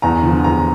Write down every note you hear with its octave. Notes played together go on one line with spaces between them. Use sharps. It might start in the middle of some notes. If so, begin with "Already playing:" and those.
E2 A#5
D3 F3
E2 A#5